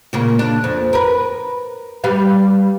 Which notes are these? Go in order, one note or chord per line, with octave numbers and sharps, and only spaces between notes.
A#2 C#3 A#3
D4
F2
A#4 B4
G3 B4 F5